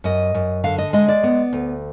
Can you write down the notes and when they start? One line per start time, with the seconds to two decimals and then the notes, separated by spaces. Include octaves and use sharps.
0.04 F#2 D#5
0.34 F#2
0.64 D3 F5
0.78 D#5
0.93 G#3 D#5
1.08 D5
1.23 B3
1.53 D2